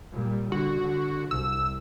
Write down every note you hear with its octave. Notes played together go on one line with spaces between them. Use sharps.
A#2 G3
D3 F#4
D3
C2 E6